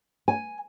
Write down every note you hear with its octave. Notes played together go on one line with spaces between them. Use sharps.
G#5